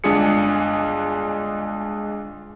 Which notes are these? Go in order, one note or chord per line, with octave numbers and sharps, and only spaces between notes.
G1 G#3 D4 F4 G#4 C#7